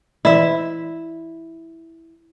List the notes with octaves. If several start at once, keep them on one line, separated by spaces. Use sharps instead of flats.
E3 E4 D5 E5